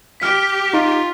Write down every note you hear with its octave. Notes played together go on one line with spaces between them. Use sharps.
G4 F6 B6
D#4 F4